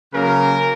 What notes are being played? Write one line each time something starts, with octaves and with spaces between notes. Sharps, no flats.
C#3 F#3 A#3 A#4